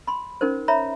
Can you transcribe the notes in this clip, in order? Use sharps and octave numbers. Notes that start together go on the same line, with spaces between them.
B5 C6
C#4 D#4 A#4 C5
C#5 E5 A#5 B5